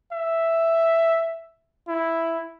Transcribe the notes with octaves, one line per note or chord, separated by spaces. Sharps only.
E5
E4